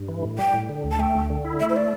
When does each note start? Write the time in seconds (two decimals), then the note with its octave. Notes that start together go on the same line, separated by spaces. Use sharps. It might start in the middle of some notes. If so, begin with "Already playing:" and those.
Already playing: G2
0.09 E3
0.23 A2
0.38 G3 G5
0.54 A2
0.69 D3
0.84 D2
0.91 A5
0.99 A3 G5
1.15 D2
1.30 D3
1.45 E4
1.60 A3 E5
1.70 C5
1.76 D5